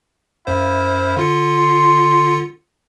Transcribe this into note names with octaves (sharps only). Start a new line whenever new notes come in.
F#2 E4 C5 F5
D3 F4 C6 C#7